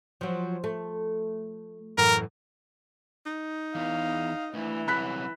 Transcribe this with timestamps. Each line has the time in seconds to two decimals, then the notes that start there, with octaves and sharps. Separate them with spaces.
0.21 F3 F#3
0.64 A3
1.98 F#2 A2 E3 A#4
3.26 D#4
3.75 E2 F5
4.54 D2 E3
4.88 C2 F#3 B5 F#6 B6